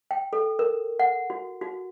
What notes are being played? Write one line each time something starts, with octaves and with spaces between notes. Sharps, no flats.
G5
A4
A#4
F#5
F#4
F#4